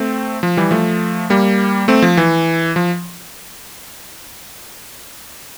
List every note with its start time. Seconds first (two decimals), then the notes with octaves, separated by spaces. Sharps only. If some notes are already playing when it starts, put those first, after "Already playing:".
Already playing: A3 C4
0.43 F3
0.57 E3 G3
0.71 F3 A3
1.30 G3 A#3
1.88 A3 C4
2.02 F3
2.17 E3
2.76 F3